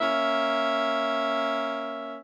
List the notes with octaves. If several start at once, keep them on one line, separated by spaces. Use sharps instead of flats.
A#3 C#4 E5